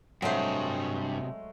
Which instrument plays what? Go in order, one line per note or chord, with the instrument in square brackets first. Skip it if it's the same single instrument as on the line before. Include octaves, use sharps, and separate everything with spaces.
[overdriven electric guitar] G2 [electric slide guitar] C3 F#4 [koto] F#3 C5 [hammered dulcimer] G#3 A3